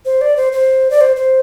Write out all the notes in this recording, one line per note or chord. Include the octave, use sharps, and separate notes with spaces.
C5
D5
C5
C5
D5
C5
C5